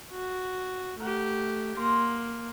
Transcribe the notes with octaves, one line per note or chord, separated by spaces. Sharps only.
F#4
A3 G4 A#4 F#5
A#3 C6